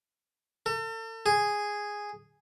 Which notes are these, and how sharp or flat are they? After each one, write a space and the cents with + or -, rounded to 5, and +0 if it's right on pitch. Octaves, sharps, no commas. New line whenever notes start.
A4 +40
G#4 -5